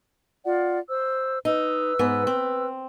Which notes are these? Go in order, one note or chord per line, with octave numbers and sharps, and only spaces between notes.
F4 D5 F#5
C5 E6
D#4 B4 E6
G#2 B3
C4